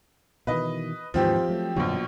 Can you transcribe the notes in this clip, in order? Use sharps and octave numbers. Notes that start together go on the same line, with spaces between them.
B2 D#3 E3 B4 D#5
D#2 G#2 E3 F3 C4 G4
F#3 A3
A#1 F#2 B2 D3 F#3